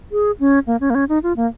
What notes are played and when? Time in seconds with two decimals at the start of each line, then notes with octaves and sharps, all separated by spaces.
0.12 G#4
0.40 C#4
0.67 A#3
0.80 C#4
0.90 A#3
0.95 C#4
1.09 D#4
1.23 F4
1.37 A#3